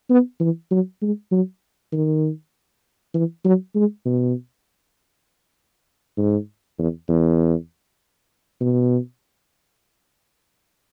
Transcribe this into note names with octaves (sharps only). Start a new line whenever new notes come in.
B3
E3
F#3
G#3
F#3
D#3
E3
F#3
G#3
B2
G#2
E2
E2
B2